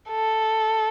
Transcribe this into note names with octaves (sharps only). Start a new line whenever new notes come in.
A4